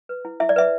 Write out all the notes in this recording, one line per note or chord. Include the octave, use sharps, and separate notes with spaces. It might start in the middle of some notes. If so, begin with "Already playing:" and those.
B4
E4
E4 E5
D5
B4 E5